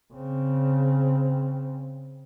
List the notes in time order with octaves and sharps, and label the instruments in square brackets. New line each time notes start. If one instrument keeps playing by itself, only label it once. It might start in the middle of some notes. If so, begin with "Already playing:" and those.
[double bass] C#3 C4